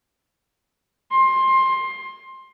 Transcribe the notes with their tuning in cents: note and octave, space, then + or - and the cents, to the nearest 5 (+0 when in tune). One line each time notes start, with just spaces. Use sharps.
C6 +20